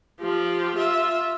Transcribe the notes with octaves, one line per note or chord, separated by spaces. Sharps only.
F3 G4
F4 E5